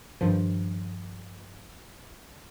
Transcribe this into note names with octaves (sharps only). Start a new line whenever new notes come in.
G2 D#3 F3